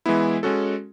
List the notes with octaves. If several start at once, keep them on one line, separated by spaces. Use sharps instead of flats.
E3 G#3 B3 E4
G#3 C#4 F#4 A4